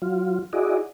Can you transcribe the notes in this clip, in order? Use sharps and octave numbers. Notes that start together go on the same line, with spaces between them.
F#3 F4
E4 F#4 G#4 D5 D#5